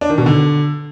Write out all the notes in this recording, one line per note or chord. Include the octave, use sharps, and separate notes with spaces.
D4
D#3
B2
D3